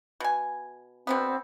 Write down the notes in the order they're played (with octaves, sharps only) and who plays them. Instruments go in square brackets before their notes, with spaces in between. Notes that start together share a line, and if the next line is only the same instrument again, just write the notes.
[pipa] B2 G#5
[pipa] B2 D3 B3 [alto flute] C4